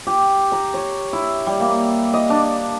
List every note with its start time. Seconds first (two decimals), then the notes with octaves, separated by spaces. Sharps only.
0.07 G4
0.52 A#5
0.74 C#5
1.13 E4
1.46 G3
1.60 A#3
2.14 D#5
2.30 D4